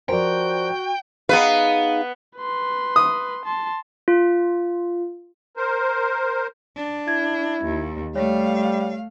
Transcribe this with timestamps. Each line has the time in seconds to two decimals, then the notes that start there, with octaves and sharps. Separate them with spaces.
0.09 F3 F#4 A#4 C5 D5 G5
1.29 B3 D#4 G#4 B4 F5
2.38 B4 C6
2.96 D#6
3.45 A5 C6
4.08 F4
5.57 A#4 C5
6.77 D4
7.08 E4 G#6
7.64 D#2
8.15 G3 A3 C#5 F5